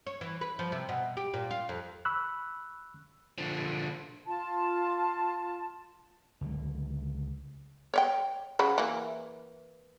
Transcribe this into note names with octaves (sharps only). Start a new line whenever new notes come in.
C#5
E3
B4
F3
C3
B2
G4
A#2
F4
F2
B5 C#6 E6 F#6
D3 F3
F4 A5
C#2 D3 F#3
C#5 D5 G5
C#3 F#3 B5
E3 A#3